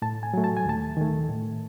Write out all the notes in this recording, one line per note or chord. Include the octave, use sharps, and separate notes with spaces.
A2 A5
G#5
F#3 A3
A5
G#5
D#2 A5
D#3 A3
A2